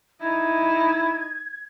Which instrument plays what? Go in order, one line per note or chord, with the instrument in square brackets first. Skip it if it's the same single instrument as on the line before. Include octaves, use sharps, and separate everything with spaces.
[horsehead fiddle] D#4 D#5 [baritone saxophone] E4 [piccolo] G#6